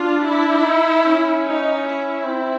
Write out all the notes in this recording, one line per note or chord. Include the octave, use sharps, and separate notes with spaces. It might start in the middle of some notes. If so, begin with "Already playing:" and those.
Already playing: D4 F4
E4
D#4
C#4
D#4
E4
C4